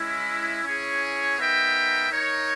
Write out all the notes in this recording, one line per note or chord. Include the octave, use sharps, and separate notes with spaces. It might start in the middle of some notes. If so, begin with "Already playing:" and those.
Already playing: G#3 C#4 E4
C#4 E4 G#4 C#5
B3 D#4 A#4 E5 G5
D#4 A#4 C#5